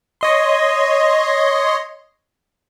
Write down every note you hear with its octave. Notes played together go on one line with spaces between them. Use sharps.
C#5 D#5 C6